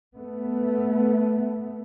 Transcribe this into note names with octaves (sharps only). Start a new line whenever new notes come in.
A3 B3